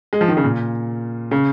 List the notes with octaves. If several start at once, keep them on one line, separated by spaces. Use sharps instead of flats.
G#3
F3
D#3
C#3
A#2
C#3